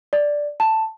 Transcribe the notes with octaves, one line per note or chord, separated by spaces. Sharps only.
D5
A5